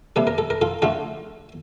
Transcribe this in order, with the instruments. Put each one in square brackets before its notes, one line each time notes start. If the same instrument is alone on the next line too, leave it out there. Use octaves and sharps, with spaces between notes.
[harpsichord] C3 G3 A#3 A4
A#4
A4
A#4
F4 A4
D3 A3 F4 A4